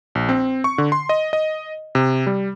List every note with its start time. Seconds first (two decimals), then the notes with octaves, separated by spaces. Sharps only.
0.15 A#1
0.29 C4
0.64 C#6
0.78 D3
0.92 C6
1.09 D#5
1.33 D#5
1.95 C3
2.27 G3